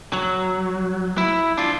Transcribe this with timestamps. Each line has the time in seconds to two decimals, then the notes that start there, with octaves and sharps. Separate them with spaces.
0.13 F#3
1.18 E4
1.58 D4 F4